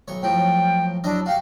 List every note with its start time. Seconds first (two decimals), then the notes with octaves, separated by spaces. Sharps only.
0.08 B1 C#5
0.22 A2 F3 F#3 G5
1.04 F#3 D4 E4 D#5
1.26 F#4 G4 F5 G5